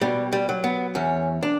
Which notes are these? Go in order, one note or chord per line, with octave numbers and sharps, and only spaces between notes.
B2 G3
G3
F#3
B3
E2 C#4
D4